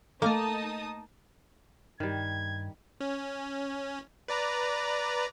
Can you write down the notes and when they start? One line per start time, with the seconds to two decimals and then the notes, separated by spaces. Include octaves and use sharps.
0.22 A3 A#3 D#4 A4 A5 D#6
2.00 G2 D#3 G3 G#6
3.00 C#4
4.28 B4 D5 A#5